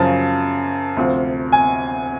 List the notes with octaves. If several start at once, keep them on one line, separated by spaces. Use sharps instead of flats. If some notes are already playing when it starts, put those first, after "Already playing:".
Already playing: F#2 C#3 F3 A5
D2 C3 F3
G#5